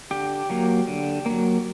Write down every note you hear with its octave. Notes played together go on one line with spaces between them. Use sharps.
D3 G4
F#3 A#3
D3
F#3 A#3